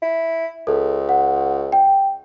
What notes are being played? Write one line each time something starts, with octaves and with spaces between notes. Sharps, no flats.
E4
C#2 A4
F#5
G5